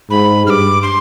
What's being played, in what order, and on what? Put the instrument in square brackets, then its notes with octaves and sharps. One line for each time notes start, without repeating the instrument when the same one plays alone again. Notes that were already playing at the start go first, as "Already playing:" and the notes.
[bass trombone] G#2 [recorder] B5
[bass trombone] G2 [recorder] F6
[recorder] D6
C6